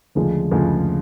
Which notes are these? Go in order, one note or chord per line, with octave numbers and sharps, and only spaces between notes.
D2 C#3 F3 G#3
D2 C#3 F3 G#3